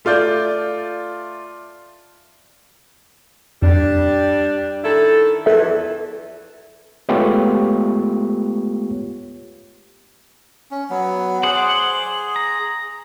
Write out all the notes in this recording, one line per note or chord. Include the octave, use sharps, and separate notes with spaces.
A3 F4 D5 G6
F2 G3 D4
D#3 E4 A4
E2 E3 F3 A4 E5
G#3 A3 B3 F4 G4 C#5
C#4
F#3 B3
G#4 C5 D5 F#5
A#5